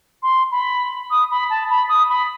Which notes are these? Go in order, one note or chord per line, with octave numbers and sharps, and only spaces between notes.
C6
B5
D#6
B5
A5
B5
D#6
B5